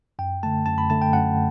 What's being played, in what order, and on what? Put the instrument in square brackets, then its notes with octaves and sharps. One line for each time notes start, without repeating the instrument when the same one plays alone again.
[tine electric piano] F#2 G5
D3 A3 A5
F#2 A5
B5
D3 A3 A5
G5
F#2 F#5